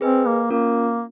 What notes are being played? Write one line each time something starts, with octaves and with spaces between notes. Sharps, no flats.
C4 G#4 B4 D#5 G#5
A#3
A#3 C#4 F4 A#4